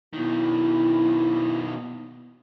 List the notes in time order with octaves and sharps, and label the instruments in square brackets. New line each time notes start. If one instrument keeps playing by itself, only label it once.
[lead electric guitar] B2 D#3 [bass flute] E4